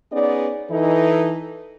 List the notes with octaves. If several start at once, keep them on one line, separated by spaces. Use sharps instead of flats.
B3 C#4 D#4 G#4 D5
E3 D#4 A4